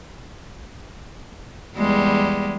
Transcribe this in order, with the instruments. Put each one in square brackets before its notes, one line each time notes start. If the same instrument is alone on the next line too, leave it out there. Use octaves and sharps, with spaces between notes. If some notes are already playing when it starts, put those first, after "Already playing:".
[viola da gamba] E2 G3 G#3